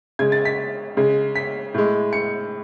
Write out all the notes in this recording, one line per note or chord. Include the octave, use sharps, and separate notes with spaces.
C#3 G#3 G#6
A6
B6
C#3 G#3
B6
A2 G#3
C#7